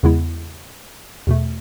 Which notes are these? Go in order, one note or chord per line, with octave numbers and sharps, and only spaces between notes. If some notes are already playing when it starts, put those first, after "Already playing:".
E2 C#3 G#3 B3 E4
E2 B2 A3